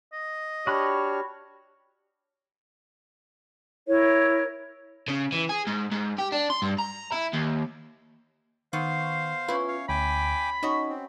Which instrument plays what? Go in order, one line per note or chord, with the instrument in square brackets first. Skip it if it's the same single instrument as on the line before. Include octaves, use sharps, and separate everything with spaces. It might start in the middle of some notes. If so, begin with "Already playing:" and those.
[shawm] D#5
[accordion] D4 G4 F6 [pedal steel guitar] F#4 B5 F#6 [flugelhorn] C#5
[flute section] E4 A#4 C#5
[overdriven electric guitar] C#3
E3
G#4
G#2
G#2
G4
D4
C6
G2
A#5
E4
D#2
[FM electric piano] D#3 C#6 [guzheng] B3 [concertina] C5 F5
[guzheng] C#4 E4 [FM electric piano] F4 B4
[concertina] C#5 F5
[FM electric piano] D2 [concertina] G5 G#5 D6 [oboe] B5
[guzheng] C#4 F#4 [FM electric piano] D#4 C#5 D#5
[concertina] C4